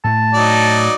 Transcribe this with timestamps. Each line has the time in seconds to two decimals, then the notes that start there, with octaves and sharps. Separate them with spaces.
0.04 A2 A3 A5
0.33 F#3 D#4 D5